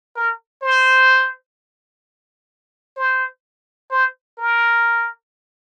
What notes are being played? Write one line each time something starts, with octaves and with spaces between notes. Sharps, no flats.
A#4
C5
C5
C5
A#4